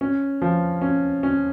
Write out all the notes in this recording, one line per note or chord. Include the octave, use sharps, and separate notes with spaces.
C#4
F3
C#4
C#4